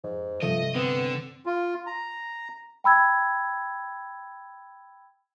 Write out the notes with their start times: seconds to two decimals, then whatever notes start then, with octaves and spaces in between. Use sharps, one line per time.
0.04 F2 G#2
0.42 G2 C3 F3 A3 D#5
0.75 D3 B3 C4
1.46 F4
1.87 A#5
2.84 G5 B5 E6 G#6